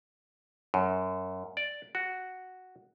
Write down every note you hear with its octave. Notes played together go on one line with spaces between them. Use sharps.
F#2
D5
F#4